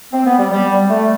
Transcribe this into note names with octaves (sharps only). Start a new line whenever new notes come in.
C4
B3
G3
G3
A3